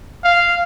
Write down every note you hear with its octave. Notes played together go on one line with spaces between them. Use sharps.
F5